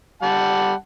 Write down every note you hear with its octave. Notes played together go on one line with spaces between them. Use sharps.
G3 F#5 A5